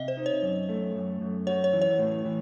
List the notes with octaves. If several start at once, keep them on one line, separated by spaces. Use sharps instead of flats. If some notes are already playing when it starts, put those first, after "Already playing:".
Already playing: C3 D#5 E5
C5
D#4
C#5
F#2
A3
F#2
F#2
F#4 C#5
C#5
E3
C#5
A2
E3